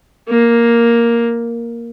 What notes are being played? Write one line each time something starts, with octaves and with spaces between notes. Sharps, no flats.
A#3